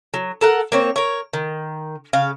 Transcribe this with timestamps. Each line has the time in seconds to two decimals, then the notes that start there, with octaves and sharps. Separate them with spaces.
0.14 F#3
0.41 A4 A#4 F#5
0.72 A#3 C4 C#5
0.96 A#4 C#5
1.33 D#3
2.13 C#3 F5